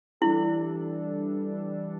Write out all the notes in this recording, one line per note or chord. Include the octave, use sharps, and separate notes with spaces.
E3 G3 D4 E4 A4